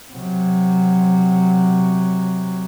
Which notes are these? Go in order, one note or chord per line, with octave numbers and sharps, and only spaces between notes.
C3 F#3